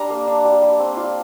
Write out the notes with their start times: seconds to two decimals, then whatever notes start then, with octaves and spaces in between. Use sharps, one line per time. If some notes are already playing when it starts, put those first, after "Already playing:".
Already playing: G3 D4 A#5
0.10 A#3
0.27 D4
0.45 G3
0.62 G3
0.79 C4
0.97 F4